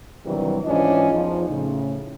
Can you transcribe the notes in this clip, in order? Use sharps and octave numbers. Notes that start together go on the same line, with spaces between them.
G2 C3 D#3 E3 F#3 G3
G#2 E3 C#4 D4 F4 D#5
E2 F3 D#4
A2 C#3